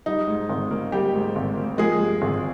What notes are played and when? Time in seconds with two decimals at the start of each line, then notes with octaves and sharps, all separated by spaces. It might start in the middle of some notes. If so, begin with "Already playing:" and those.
0.06 G3 D#4
0.28 G#2
0.49 G#1
0.71 A#3
0.92 G3 G4
1.14 G#2
1.36 G#1
1.57 A#3
1.78 F3 G#3 G#4
2.01 G2
2.22 G#1